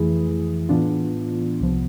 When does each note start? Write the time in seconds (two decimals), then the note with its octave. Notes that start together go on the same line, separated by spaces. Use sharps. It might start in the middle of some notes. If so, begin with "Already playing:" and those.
Already playing: F2 E3 A3 E4 G#4
0.69 A2 E3 B3 D4 F4
1.61 C2 C3 F3 B3